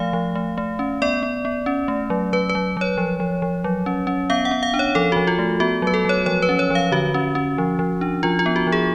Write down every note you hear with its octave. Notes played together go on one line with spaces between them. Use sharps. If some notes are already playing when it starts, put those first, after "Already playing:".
Already playing: F3 A3 F5
F3
A3
A3
C#4
B3 D5
B3
B3
C#4
A3
F#3
F#3 B4
B4
F#3
F#3 C#5
F3
F3
F3
F#3
C#4
C#4
B3 F5
F#5
B3
F5
D4
C#5
F3 A4
F3 F#4
F4
A3
B3 F#4
F#3 B4
A4
F#3 C#5
F3 C#5
B4
C#4
C#5
F3 F5
D3 F#4
C#4
C#4
F3
F3
D4
F3 F4
F4
B3
F#4
F3
G#4